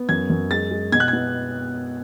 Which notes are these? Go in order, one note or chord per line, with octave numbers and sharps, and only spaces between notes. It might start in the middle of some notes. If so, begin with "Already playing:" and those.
Already playing: B3
F#2 G#6
F#2
G#3 A6
G#3
B2 G#6
F#6
B3 G#6